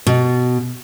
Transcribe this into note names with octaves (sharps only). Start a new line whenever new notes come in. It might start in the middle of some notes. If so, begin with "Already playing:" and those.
B2